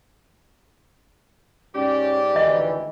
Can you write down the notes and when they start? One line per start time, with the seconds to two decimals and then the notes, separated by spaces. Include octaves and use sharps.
1.75 G#2 C#4 G4 D5
2.36 D2 D#3 E3 D#5